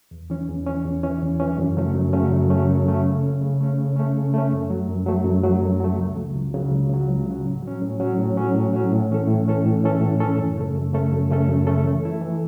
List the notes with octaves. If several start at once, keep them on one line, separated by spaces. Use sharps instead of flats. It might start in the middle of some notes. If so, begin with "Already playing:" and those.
E2
E3 C#4
E2
E3 C#4
E2
E3 C#4
E2
E3 C#4
F#2
C#3 F#3 A3 C#4
F#2
C#3 F#3 A3 C#4
F#2
C#3 F#3 A3 C#4
F#2
C#3 F#3 A3 C#4
C#3
A3 C#4
C#3
A3 C#4
C#3
A3 C#4
C#3
A3 C#4
F#2
F#3 A3
F#2
F#3 A3
F#2
F#3 A3
F#2
F#3 A3
C#2
C#3 F#3
C#2
C#3 F#3
C#2
C#3 F#3
C#2
C#3 F#3
A2
F#3 C#4
A2
F#3 C#4
A2
F#3 C#4
A2
F#3 C#4
A2
E3 C#4 A4
A2
E3 C#4 A4
A2
E3 C#4 A4
A2
E3 C#4 A4
F#2
C#3 A3 C#4 A4
F#2
C#3 A3 C#4 A4
F#2
C#3 A3 C#4 A4
F#2
C#3 A3 C#4 A4
E3
A3 E4 A4
E3